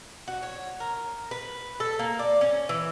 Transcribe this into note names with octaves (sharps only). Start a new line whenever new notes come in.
F#4
C#5
A#4
B4
A4
A#3
D5
C#4
E3